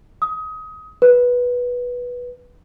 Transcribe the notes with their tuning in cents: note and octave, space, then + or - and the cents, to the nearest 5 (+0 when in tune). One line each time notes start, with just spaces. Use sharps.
D#6 +25
B4 -10